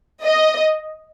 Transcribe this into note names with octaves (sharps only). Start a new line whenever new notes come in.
D#5